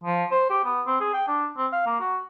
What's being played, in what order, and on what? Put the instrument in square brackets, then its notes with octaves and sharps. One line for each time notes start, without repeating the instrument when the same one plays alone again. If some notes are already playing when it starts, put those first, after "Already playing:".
[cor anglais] F3
C5
G4
B3
C4
G#4
G5
D4
C4
F5
A#3
F#4